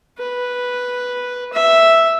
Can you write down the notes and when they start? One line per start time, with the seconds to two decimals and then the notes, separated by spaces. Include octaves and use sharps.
0.18 B4
1.53 E5